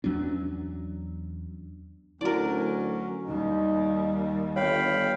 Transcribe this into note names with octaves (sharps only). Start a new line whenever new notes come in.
E2 F#3 C#4 D4
D2 F#3 C#4 E4 F#4 A#4 D5
D#2 G3 D#4
G1 C#5 F5 G5 B5